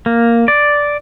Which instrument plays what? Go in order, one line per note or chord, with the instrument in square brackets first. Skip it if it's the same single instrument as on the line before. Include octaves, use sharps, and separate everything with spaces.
[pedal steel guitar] A#3
D5